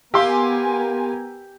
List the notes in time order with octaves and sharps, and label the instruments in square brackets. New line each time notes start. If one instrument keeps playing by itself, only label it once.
[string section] B3 A#4 G#5 [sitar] G4 [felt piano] F5 C6 E6